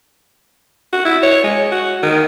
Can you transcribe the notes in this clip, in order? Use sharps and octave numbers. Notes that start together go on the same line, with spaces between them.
F#4
E4
C#5
G#3
F#4
D#3